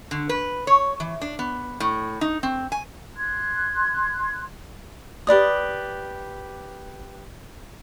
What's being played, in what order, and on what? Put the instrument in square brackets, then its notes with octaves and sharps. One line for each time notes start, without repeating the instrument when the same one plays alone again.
[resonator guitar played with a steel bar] D3
B4
C#5
E3
D4
B3
A2
D#4
C4
G#5
[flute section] C6 F#6 G#6
[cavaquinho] G4 B4 D5 D#6